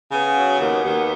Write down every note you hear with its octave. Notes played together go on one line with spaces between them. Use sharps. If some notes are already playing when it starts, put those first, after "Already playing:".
C#3 B3
F#3
D#2
D#2